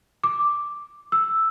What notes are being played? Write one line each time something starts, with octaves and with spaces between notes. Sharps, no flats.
D6
E6